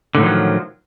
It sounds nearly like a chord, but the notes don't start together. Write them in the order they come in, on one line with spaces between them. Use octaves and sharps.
D3 A2 D#3 F3 F#3